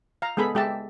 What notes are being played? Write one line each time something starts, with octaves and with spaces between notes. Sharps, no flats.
F5 A#5
G#3 B3 G#4 A4 B5
G#3 G4 E5 A5